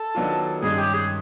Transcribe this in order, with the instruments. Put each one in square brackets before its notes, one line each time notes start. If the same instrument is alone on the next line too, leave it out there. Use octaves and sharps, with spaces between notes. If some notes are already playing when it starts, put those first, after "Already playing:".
Already playing: [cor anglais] A4
[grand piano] D#3 F#3 B3 D4 F4
[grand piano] G2 D#3 G#3 C#4 [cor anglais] G#4
[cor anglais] G4
G#4